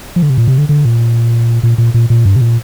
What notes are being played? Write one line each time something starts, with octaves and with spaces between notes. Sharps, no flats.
F3
D3
C3
A#2
C3
D3
D3
A#2
A#2
A#2
A#2
A#2
G2
C3
A#2